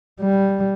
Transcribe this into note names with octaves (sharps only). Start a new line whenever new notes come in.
G3